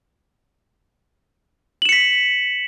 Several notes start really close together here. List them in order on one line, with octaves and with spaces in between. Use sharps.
F#7 E7 C#7 B6